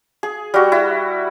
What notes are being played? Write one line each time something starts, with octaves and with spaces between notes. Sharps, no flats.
G#4
G3 F#4
E4